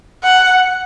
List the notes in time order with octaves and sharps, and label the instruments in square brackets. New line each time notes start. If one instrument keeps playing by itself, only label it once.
[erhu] F#5